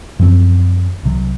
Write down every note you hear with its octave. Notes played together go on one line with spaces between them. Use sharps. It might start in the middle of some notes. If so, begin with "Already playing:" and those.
F#2 F3 C4
C2 C3 F#3